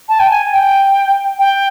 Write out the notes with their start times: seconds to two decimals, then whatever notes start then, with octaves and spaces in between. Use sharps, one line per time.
0.09 A5
0.20 G5
0.31 G#5
0.53 G5
1.39 G5